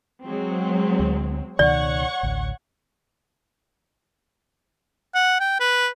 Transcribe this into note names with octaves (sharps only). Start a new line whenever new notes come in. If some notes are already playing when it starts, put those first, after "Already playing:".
F#3 G#3 C4
D2
C#2 B2 D#3 C#5 D5 F#5 C#6
A1 D2
F#5
G5
B4